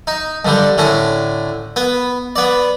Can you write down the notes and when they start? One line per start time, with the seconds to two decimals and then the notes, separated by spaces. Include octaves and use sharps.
0.07 D#4
0.45 G2 D3 G3
0.78 A2 D3 C#4
1.76 B3
2.36 B3 D5